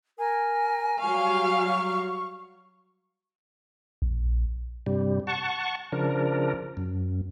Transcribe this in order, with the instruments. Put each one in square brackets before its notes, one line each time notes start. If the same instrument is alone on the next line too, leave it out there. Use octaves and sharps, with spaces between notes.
[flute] A#4 [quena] G#5
[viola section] F#3 G3 F5 [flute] C#6
[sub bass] A#1
[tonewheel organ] G2 C3 G3
F#5 A5 C#6
C#3 F3 D4 A#4
F#2